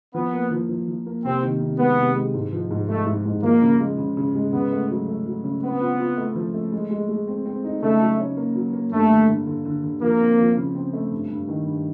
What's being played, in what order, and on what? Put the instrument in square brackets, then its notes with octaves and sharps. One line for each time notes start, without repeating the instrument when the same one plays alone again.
[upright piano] F3 [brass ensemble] B3
[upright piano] A#3
F3
F3
F3
A#3
[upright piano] C3 [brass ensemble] C4
[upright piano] D#3
C3
[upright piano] G#3 [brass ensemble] B3
[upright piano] C3
G#3
G#2
F3
G#2
[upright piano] G#3 [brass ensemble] A3
[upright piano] G#2
G#2
[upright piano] F3 [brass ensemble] A#3
[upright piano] C#3
G#3
C#3
C#3
G#3
[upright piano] C#3 [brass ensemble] B3
[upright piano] A3
F#3
A3
F#3
C#3
[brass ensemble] B3 [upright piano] C4
[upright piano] F4
F4
A3
F3
A3
G#3
G#3
G#3
C4
C4
D#4
[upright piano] C#3 [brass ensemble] A3
[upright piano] F#3
C#4
A#3
F#3
A#3
[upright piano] G2 [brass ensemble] A3
[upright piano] D3
D3
D3
D3
D3
[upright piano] F3 [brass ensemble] A#3
[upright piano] C4
F3
C#3
C4
A3
G2
G2
D#3
G2